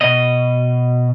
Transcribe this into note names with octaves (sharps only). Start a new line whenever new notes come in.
B2 D#5